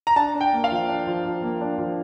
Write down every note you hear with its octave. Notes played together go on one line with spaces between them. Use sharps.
A#5
D4 A5
D4
G5
A#3
F5
F3
D4
F3
F3
A#3
D4
F3